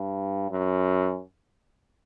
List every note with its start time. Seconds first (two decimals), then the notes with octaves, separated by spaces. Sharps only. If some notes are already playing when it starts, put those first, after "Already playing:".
Already playing: G2
0.51 F#2